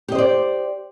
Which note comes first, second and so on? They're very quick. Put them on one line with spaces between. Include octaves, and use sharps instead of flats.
G4 D#5 C5 D5